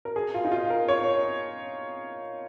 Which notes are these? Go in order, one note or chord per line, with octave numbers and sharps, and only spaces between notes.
A#4
G#4
F4
D#4
F4
A#4
C#5